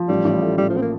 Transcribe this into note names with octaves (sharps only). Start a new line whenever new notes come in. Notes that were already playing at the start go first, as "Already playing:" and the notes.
Already playing: F3
A1 G3
A1
A2
A1 G3
F3
C4
A#3